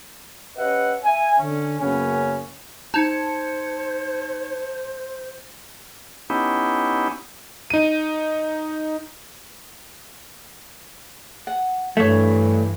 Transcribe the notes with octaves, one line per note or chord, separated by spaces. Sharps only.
C#4 G4 B4 D#5 E5 F#5
E5 G#5
D3 C#4
F#2 C#3 A#3 B3 C#4
D#4 C5 A5 G#6 C#7
B3 C#4 D#4 E4 G4
D#4 D#7
F#5
G2 E3 A3 C#5 E5